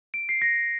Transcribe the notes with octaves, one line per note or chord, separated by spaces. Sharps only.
D7
C7
A#6